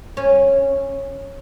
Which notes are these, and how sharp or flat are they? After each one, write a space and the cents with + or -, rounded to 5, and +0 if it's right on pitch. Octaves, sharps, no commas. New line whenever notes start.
C#4 -10